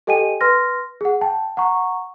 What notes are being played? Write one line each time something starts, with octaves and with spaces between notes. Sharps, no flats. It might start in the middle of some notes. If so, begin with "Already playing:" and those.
G4 A4 D#5 G5 G#5 D#7
B4 C6 F6 A#6
G#4 F#5
G5 A5
F#5 A#5 C#6